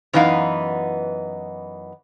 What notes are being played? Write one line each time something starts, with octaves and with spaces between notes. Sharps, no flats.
F#2 E3 B3 D#4 F5